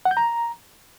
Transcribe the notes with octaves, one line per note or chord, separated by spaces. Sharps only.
F#5
G6
A#5